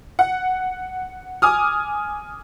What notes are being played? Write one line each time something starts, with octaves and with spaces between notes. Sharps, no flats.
F#5
G#5 D6 D#6 F6